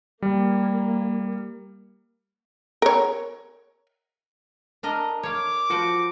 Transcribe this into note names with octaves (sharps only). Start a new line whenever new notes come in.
G3 A#3
A#4 C#5
D4 A#4 D#5
C#5 F5 D6
F3 F4 F#4 C5 C#7 D7